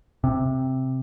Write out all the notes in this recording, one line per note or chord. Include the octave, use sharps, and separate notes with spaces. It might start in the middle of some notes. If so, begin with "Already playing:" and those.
C3